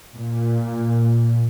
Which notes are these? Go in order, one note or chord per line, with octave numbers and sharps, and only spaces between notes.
A#2